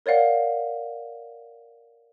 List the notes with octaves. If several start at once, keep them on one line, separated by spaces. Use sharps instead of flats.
A#4 C#5 D5 F5 F#5